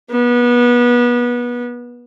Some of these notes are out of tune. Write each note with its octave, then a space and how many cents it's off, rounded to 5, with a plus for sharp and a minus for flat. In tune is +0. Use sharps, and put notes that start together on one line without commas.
B3 -25